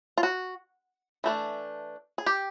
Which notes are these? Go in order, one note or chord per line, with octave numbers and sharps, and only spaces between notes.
F4
F#4
E3 A3 D4
G#4
G4